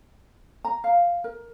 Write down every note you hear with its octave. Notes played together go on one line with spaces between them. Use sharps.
A#5
F5
A#4